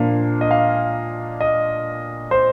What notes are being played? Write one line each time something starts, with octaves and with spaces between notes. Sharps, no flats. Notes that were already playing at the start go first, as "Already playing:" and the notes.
Already playing: A#2 F3 A#3 D4 F5
D#5
F5
D#5
C5